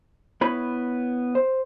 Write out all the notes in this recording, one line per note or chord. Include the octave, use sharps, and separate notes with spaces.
B3 E4 C#5 B5
C5